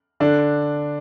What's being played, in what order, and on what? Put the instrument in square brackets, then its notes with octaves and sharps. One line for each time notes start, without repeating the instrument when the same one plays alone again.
[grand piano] D3 D4